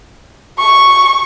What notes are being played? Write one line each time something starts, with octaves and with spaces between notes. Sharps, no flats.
C#6